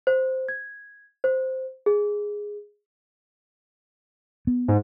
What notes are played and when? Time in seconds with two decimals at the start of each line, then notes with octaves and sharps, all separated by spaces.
0.07 C5
0.49 G#6
1.24 C5
1.86 G#4
4.47 B3
4.68 G#2